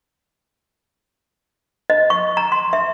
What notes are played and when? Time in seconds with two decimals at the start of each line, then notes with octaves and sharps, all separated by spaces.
1.90 D#5
2.10 C#6
2.37 A#5
2.52 C6
2.73 E5